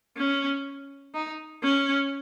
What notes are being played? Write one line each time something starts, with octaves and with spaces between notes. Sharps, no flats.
C#4
D#4
C#4